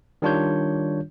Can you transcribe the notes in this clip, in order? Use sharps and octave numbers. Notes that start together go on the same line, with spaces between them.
D#3 G3 D4 F4 C#5 G6